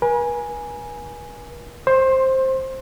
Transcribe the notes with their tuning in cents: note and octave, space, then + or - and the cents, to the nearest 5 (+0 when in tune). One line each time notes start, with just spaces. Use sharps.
B4 -45 G#5 +0
C5 +10 C6 +30